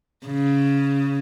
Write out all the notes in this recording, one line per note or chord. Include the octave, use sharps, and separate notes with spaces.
C#3